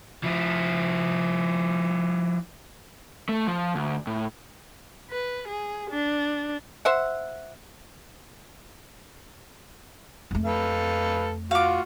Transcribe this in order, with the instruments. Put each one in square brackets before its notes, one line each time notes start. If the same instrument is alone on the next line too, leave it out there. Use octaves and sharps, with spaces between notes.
[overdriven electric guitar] F3 E4
[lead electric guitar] A3
F3
D2
A2
[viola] B4
G#4
D4
[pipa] C5 E5 F#5
[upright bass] F2 A3
[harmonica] A4 B4 F5
[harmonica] F4 F#4 [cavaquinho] F5 D6